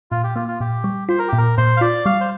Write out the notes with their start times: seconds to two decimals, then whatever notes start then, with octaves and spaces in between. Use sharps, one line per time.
0.11 A#2 F4
0.24 G4
0.36 A#3 F4
0.48 F4
0.60 A#2 G4
0.84 G3
1.09 F4 C5
1.19 A#4
1.28 A#2 G4
1.38 A#4
1.58 A#2 C5
1.77 F5
1.81 F4 D5
2.06 G3 F5
2.21 C5